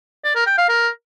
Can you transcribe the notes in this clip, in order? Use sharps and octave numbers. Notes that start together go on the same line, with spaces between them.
D5
A#4
G5
F5
A#4